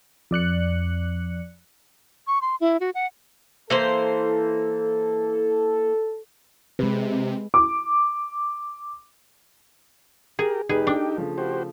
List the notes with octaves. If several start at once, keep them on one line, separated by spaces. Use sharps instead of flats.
F2 D5 F#6 C#7
C#6
C6
E4
F#4
F#5
E3 A#3 A4 C5
C3 G#3 B4
D6
G4 G#4 A#4
F1 D#4 G4 G#4 B4
D4 A4 G5 D6
C#3 F3 A3
F#4 G4 C5